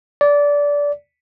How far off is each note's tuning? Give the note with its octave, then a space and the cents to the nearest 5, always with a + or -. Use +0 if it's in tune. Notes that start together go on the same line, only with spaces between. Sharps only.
D5 -20